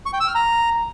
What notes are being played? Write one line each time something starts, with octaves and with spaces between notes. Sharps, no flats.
C#6
G5
E6
F6
A#5